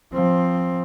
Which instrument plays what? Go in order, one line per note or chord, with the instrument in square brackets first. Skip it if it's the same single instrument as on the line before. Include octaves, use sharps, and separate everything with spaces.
[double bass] F3 C4